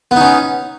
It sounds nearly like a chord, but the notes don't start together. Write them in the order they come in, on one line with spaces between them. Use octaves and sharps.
B3 D#4 C#4